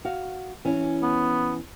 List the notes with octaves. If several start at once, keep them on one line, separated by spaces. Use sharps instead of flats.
F#4 F5
E3 C#4
B3